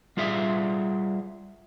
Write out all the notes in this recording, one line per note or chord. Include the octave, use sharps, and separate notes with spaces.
G3 F4 G#4 E5